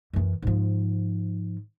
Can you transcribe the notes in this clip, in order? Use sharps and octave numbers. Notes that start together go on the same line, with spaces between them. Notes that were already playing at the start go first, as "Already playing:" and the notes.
F#2 E3
G#2 F3